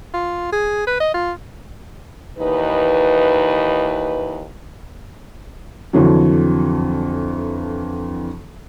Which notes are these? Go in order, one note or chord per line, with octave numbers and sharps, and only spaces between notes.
F4
G#4
B4
D#5
F4
D#2 E3 D#4 B4
F2 D3 E3 F#3